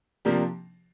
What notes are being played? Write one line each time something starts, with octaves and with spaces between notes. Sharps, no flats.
C3 F3 A#3 D4 G4